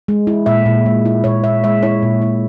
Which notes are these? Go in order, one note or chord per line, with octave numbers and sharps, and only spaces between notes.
G#3
E4
A#2 E5
A#2
G#3
E4
A#2 C#5
A#2 E5
G#3 E5
E4 C#5
A#2
E4